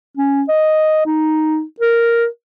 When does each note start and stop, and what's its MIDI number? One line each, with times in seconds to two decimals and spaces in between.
0.17 0.43 61
0.48 1.02 75
1.06 1.62 63
1.80 2.26 70